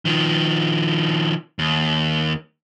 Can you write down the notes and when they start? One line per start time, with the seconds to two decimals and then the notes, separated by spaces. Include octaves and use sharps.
0.05 D#3 F3
1.59 D#2